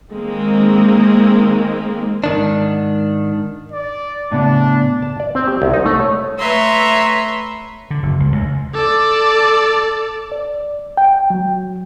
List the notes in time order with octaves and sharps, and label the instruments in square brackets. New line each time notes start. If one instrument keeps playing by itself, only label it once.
[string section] D#3 G#3 A#3 C4
[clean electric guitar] G#2 D#3 D4
[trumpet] D5
[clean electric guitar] A2 C#3 B3 [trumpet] D4
[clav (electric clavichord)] A5
D5
C4
G4
C2
D#4
A3
C#5
[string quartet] A3 B4 C#5 E5 A#5 C6
[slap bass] D3
F#1
C#2
C#2
[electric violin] A4 D5
[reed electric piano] D5
G5
F#3